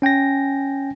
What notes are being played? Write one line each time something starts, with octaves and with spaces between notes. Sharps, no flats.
C#4 G5 G#5 A#6